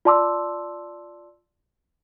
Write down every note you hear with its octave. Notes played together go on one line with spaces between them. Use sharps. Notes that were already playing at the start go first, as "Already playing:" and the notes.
F4 D5 A5 C6 D6 E6